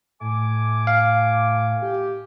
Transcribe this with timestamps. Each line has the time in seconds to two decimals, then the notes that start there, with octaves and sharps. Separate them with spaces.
0.21 A2 A3 G#5 D6
0.87 F5
1.82 G4